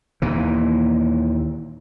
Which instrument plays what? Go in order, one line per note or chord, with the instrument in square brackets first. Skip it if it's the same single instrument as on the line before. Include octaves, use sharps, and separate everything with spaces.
[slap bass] D#2 A#2 E3